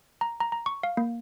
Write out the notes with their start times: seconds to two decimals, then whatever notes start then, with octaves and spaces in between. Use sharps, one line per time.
0.21 A#5
0.40 A#5
0.52 A#5
0.66 C#6
0.83 F5
0.97 A#3